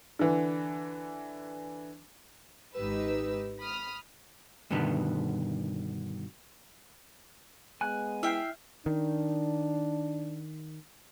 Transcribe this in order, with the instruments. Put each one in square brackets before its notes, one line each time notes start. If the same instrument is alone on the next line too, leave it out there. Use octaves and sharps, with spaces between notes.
[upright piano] D3 E3
[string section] G#1 G#2 D#4 G4 B4 E6
B5 D#6 F6
[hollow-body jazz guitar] G2 B2 D3 D#3 B3
[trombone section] G#3 B3 [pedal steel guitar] G#5 F#6
[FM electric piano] E4 F6 C7 [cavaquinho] E5 G5
[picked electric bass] D#3 [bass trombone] D4